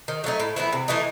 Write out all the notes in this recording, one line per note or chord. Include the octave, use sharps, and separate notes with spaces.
D#3
F#3 A3 D#4
A2
E3 B3 E4
C3
E3 A3 D#4